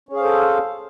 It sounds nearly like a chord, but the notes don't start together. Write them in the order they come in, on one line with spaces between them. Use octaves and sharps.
C#4 G#4 F5 C5 A4